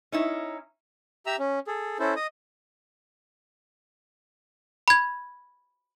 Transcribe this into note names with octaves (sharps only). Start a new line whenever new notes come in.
C#4 D#4 E4
G4 E5 A#5 E6
C#4
G#4 A4
C#4 E4 A4 C5
D#5 D#6
B5 G#6